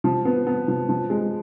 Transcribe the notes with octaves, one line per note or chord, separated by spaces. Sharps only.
F3
B3
B3
F3
F3
G#3